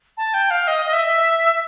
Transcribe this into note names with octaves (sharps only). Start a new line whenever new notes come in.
A5
G5
F5
D#5
D#5
E5